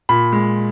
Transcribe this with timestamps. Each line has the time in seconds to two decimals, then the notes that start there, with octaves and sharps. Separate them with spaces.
0.09 A#2 B5
0.32 G#3